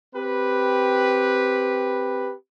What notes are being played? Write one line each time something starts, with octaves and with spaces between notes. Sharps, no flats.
C4 G4 B4